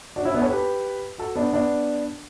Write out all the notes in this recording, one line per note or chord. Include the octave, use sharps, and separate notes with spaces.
D4 F#4
C#4 E4
B3 D4
A4 C#5
G4 B4
F#4 A4
B3 D4
B3 D4